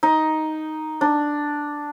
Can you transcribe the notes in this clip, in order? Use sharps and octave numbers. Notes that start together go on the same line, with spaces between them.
D#4
D4